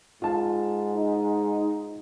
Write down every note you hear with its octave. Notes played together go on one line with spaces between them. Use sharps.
G#2 F4 A5
D#4